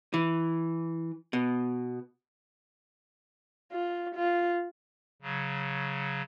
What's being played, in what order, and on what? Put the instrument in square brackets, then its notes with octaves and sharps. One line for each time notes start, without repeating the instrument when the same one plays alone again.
[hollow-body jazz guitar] E3
B2
[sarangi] F4
F4
[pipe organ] C#3 F#3